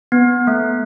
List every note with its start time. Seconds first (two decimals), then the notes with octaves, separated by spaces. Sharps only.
0.12 B3
0.47 A3